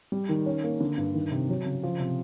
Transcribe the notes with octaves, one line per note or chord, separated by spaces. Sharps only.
G3
D#3
C#4
A#3
D3
G2
D#3
C3
F#3
C#3
F3
C3